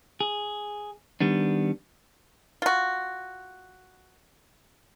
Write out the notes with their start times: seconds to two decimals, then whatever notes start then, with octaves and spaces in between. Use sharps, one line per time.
0.21 G#4
1.21 D#3 G3 B3 D4
2.62 F4 F#4